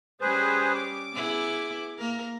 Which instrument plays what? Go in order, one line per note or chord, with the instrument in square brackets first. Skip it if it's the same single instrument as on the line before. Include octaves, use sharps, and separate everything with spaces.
[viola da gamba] G3 C#4 [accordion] G#4 B4 C5
[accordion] D6
[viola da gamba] B3 E4 G#4
A#3 A#4